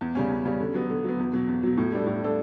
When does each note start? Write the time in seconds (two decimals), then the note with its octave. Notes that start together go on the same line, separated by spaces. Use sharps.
0.01 E2
0.15 C#3 G3 C#4
0.30 E2
0.45 C#3 G3 C#4
0.60 D3
0.74 F#3 B3
0.90 D3
1.04 F#3 B3
1.19 E2
1.33 B2 F#3
1.48 E2
1.63 B2 F#3
1.77 A2
1.92 G3 D4 A4
2.06 A2
2.22 G3 D4 A4